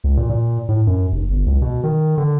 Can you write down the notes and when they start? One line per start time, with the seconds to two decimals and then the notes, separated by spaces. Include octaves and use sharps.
0.04 C#2
0.17 A#2
0.29 A#2
0.69 A2
0.87 F#2
1.12 F1
1.30 G1
1.46 C#2
1.62 B2
1.83 D#3
2.18 D3